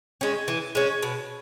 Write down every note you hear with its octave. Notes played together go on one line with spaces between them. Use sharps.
G#3 C#4
E3
G#3 C#4
B2